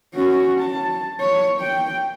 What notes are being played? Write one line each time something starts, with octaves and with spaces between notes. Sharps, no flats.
C#4 F#4
A5
C#5
G5